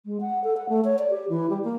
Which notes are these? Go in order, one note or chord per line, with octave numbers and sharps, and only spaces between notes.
G#3
F#5
A4
F#5
A3
C#5
D5
G4
E3
G3
A#3